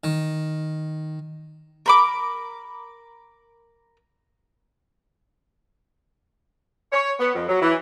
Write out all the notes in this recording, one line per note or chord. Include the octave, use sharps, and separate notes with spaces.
D#3
A#4 B5 D6
C#5
B3
F2
F#3
E3